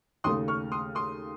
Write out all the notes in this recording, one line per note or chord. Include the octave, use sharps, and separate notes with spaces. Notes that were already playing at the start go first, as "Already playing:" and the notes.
D#2 C#3 A3 C6 D#6
C#6 F6
C6 D#6
C6 D#6